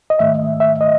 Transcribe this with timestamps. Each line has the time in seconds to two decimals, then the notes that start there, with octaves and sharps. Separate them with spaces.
0.10 D#5
0.19 G#2 D#3 A3 E5
0.60 E5
0.81 D#5